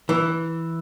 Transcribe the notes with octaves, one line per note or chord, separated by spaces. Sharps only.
E3